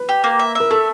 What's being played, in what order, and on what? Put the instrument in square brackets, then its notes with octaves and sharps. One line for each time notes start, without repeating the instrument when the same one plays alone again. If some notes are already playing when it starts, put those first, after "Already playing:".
Already playing: [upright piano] B4
[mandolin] G4
A#3
E5
[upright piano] A#4 [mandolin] E5
[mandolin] A3 [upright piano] A4